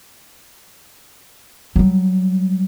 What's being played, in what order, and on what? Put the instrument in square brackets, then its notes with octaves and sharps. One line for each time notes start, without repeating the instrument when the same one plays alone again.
[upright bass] F#3 G3